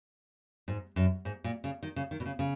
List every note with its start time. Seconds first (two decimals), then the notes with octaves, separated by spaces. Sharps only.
0.68 G#2
0.96 F#2
1.25 G#2
1.44 A#2
1.64 C#3
1.83 D#3
1.96 C#3
2.11 D#3
2.20 B2
2.26 C#3
2.39 C#3